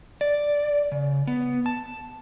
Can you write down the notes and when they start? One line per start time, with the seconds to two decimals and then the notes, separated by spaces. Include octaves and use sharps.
0.21 D5
0.92 C#3
1.27 B3
1.66 A5